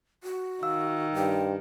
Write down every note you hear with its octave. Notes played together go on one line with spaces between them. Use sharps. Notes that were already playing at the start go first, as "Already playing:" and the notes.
F#4
D#3 F5 E6
G2 G5